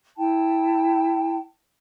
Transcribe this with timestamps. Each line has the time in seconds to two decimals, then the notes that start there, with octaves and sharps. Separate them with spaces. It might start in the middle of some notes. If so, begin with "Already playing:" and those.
0.17 E4 G5 A5